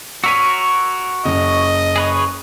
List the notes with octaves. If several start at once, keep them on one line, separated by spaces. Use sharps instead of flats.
F#4 A#4 C#5 E6 B6 D#7
F#1 D#5
G#4 B4 C#5